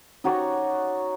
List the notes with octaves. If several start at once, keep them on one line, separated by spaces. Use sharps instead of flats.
D#4 F#4 C#5 D5